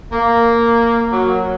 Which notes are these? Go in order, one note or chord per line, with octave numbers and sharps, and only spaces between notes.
A#3
F#3